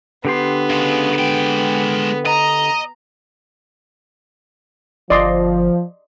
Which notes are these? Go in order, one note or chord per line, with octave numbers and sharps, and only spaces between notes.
D3 B3 G4 C6
C#3 G#3
G#3 G5
D#5 A#5
G1 F3 D5 D#5 C6